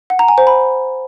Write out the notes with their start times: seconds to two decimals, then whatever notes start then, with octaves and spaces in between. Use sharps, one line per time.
0.10 F#5
0.19 A#5
0.28 G#5
0.38 C5
0.47 B5